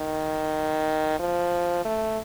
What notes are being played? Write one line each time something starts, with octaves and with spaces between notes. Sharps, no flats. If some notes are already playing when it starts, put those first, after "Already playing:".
Already playing: D#3
F3
A3